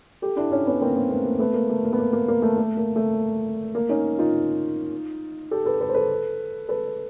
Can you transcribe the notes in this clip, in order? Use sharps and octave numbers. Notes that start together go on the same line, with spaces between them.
G4 A4
D4 E4
C#4 D#4
B3 C#4
A#3 C4
A#3
A3 B3
A#3
A3 B3
A#3
A3
A#3
B3
A#3
A#3
A#3
A3
A3
A#3
A3
A#3
C#4 D#4
D#4 F4
G4 A4
A4 B4
A4 B4
C5
A4 B4
A4 B4